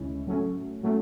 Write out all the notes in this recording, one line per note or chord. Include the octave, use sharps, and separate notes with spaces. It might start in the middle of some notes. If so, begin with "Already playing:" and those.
Already playing: D2 C#3 G#3 C#4 E4
A2 F#3 A3 C#4
A2 F#3 A3 C#4